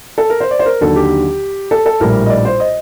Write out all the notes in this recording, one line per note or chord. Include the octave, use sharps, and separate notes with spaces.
A4
A#4
C5
D5
C5
A#4
D#2 D3 F#3 A4
G4
A4
A4
A#1 A2 G3 A#4
D#5
D5
C5
D#5